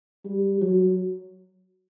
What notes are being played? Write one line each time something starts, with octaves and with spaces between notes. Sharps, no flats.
G3
F#3